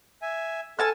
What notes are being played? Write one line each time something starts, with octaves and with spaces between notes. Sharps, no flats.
E5 G#5
A4 G#5 A5 F6